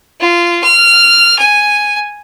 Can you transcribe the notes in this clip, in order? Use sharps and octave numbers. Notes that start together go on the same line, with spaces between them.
F4
F6
G#5